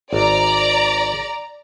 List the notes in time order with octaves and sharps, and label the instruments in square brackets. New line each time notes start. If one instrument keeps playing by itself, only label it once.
[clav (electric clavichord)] G#1 [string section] D5 A#5